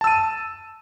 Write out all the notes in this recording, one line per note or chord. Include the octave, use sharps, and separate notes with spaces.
A5 E6 D#7